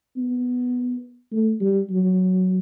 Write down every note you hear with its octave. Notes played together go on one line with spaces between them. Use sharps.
B3
A3
G3
F#3